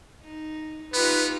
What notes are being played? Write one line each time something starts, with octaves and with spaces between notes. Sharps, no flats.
D#4
B3 D#4 F4 G4 B4